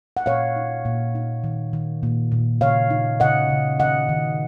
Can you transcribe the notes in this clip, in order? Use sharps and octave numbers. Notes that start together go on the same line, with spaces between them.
F#5
A#2 C#5 F5
D#4
A#2
D#4
D#3
D#3
A#2
A#2
C#3 C#5 F5
D#4
C#3 D#5 F#5
C#3
D#3 D#5 F#5
D#3